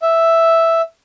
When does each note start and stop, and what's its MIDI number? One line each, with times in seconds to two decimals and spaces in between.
0.02 0.82 76